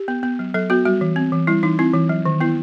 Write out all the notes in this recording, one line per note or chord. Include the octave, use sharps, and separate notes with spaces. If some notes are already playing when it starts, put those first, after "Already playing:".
Already playing: G4
B3
B3
F#3
F#3 A4
B3 F#4
G3 F#4
E3
C4
E3
G3 E4
E3 D#4
C4 E4
E3
F#3
D#3
B3 E4